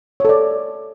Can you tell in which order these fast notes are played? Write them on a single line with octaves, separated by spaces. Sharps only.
C#5 A4 D5